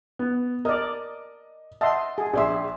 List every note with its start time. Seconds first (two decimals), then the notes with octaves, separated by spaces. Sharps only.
0.19 B3
0.65 A#4 D5 D#5 D#6
1.81 D#5 E5 F#5 A5 C6
2.18 G#4
2.33 A#1 G#4 D5 E5 C6